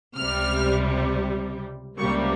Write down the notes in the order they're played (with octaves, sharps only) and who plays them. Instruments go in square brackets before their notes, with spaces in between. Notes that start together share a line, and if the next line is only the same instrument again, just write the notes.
[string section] C#2 C3 G3 F6
C#2 C3 G3 A#3 C#6